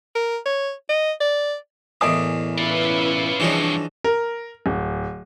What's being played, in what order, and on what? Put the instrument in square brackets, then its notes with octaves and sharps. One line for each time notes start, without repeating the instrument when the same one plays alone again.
[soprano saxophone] A#4
C#5
D#5
D5
[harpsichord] E2 A2 A#3 [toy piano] D#5 G#5 D#6
[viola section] C#4 E4 B4 [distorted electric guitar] F4 D5
[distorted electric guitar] G2 C3 [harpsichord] E3 F3 D#4 [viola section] D4 G#4 C#5
[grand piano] A#4
D1